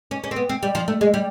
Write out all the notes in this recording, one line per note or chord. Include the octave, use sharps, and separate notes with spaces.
C#4
C#4
C4
B3
C4
G3
F3
A3
G#3
G3